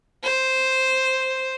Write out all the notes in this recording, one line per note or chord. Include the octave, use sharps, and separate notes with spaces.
C5